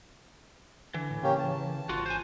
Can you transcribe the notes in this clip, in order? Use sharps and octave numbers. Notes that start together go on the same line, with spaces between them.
D3 E3
A2
C#3 A#3 C#4 G4
A5
G#1 F4 F#4
C5 G#5